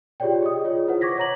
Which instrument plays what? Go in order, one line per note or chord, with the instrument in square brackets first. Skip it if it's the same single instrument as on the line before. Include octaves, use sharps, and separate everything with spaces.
[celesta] F4 G4 G#4 C#5 D5 G5
G#4 D#5 D#6
F4 G#4 C#5
E4 F4 B4 C5 F#5
C#6 D6 G#6 A#6 B6
C#5 A#5 F#7